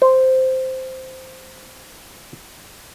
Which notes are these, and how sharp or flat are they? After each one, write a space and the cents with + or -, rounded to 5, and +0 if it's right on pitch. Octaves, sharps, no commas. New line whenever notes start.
C5 -5